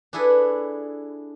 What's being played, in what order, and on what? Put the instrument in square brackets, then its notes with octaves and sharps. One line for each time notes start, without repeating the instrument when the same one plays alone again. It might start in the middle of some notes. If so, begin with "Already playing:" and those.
[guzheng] D4 E4 G#4 A4 B4